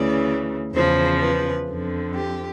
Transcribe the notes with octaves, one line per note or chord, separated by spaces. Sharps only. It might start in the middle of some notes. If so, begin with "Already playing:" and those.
Already playing: D2 C#3 E3 D5
E2 C#3 F3 C5
B4
F2 D3 F3
G4